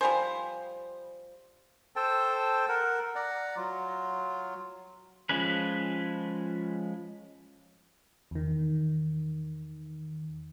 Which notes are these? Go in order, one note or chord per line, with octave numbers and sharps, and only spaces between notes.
F3 G3 C5 G#5 B5
A4 C5 G5 A5
A#4 F#5
D5 F#5 A#5
F#3 F4
F3 G#3 C#4 B4
E2 D#3